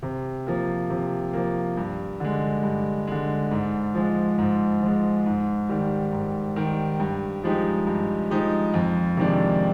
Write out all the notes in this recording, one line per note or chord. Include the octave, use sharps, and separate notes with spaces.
C3
F3 A#3
C3
F3 A#3
G2
D3 G#3
G2
D3 G#3
G#2
F3 G#3
G#2
F3 G#3
G#2
D#3 G3
G#2
D#3 G3
G2
F3 G#3 D#4 G4
G2
F3 G#3 D#4 G4
F2
C3 D#3 G#3 D4